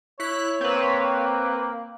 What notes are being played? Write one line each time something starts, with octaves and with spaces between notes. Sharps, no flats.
E4 C#5 F#6 B6
A#3 C4 B4